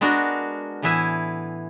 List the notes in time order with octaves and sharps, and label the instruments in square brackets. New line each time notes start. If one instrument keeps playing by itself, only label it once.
[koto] G#3 B3 D4 F#4 A#4
A2 E3 B3 E4 E5 G#5